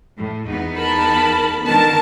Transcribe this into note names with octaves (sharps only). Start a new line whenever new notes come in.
A2
E2 B3 D#4
A#4 A5 B5
D3 D#3 B3 A#4 A5